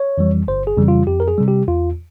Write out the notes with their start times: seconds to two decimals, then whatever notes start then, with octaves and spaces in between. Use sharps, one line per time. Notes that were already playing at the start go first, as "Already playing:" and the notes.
Already playing: C#5
0.18 F2 E3 G3
0.48 G1 C5
0.67 G#4
0.77 F2 C#3 E3 G3
0.88 F4
1.07 F2 G4
1.20 A#4
1.28 G#4
1.38 C3 G3
1.48 G4
1.68 E2 F4